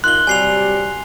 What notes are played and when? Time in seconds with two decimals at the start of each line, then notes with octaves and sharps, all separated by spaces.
0.04 D#3 F4 C6 F#6 G7
0.27 C3 F#3 G3 G#5 C7 F7